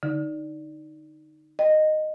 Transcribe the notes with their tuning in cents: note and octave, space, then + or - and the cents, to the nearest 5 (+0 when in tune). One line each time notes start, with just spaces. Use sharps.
D3 +0 D#4 +0
D#5 -10 G5 +0